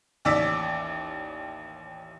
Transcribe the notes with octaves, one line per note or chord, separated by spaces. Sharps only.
A1 D#2 D5 D6 E6 B6